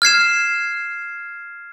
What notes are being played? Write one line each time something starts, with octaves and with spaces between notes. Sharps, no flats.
F6 G#6 C7 E7